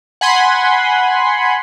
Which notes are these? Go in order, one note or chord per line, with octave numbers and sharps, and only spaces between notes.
F#5 G#5 B5 C6